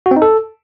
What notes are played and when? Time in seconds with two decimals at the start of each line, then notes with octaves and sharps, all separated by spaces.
0.06 F#4
0.11 C4
0.17 D#4
0.22 A4